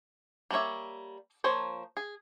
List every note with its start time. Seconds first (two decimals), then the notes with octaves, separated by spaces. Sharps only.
0.51 G3 A#3 A4 C#5 E5
1.44 F3 A#3 C5 C#5
1.97 G#4